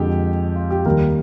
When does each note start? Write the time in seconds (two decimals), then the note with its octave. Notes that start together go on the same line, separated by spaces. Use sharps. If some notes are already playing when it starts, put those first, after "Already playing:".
Already playing: F2 D3 G#3 G4
0.56 F4
0.71 G4
0.85 D#2 D#3 G3 A#3 G4 A#4